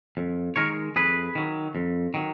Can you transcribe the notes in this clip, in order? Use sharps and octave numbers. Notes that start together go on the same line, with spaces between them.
F2
D#3 G#3 A#4 C#5
F2 G#4 B4
D#3 F#3
F2
D#3 F#3